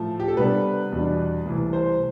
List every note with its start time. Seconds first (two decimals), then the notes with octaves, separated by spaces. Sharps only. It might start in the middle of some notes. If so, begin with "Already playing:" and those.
Already playing: A2 F3 A3
0.20 G4
0.28 A4
0.36 C3 G3 B3 D4 B4
0.92 E2 B2 G3 D4
1.46 C2 C3 E3 A3
1.73 C5